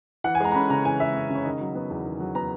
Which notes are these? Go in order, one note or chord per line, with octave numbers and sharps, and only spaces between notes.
E3 F#5
G#5
G#3 A#5
A#5
C#4 B5
C#3 A#5
E3 G#5
G#3 E5
C#4
C#3 C#5
D#3 D#5
F#3
B3
E2
D#3
F#3
B3 A#5